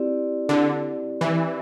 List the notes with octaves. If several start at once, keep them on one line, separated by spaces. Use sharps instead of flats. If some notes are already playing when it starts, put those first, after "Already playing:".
Already playing: C4 E4 G4 D5
D3
E3